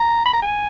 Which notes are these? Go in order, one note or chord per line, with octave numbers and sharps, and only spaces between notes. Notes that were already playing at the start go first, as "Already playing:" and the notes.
Already playing: A#5
B5
A#5
G#5